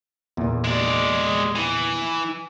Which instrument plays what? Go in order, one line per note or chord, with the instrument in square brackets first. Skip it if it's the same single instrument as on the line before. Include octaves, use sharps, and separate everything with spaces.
[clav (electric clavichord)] E2 A#2
[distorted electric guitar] G#3 D5
E3